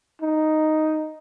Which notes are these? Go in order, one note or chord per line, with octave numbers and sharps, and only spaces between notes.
D#4